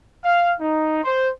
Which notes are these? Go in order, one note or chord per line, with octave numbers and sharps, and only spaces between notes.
F5
D#4
C5